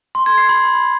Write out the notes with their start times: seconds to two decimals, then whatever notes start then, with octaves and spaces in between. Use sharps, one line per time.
0.15 C6
0.26 G#6
0.38 C7
0.49 B5